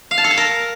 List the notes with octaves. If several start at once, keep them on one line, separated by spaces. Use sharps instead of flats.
F5
A5
A4
A5
A#4